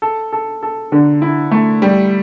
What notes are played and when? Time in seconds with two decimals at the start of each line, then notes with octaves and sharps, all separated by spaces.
0.02 A4
0.33 A4
0.63 A4
0.92 D3
1.22 E4
1.51 A3
1.82 G3